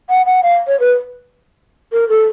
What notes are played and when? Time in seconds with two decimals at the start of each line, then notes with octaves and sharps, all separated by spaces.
0.09 F#5
0.26 F#5
0.43 F5
0.67 C#5
0.80 B4
1.93 A#4
2.09 A4